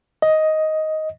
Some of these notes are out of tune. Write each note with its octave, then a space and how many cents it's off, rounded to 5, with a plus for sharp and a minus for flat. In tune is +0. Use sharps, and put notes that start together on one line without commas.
D#5 +10